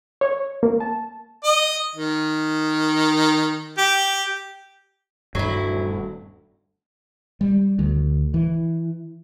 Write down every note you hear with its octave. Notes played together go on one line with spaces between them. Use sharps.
C#5
A#3
A5
D#5
D#3
G4
D#1 D2 G2 F#3 G3 E4
G3
D2
E3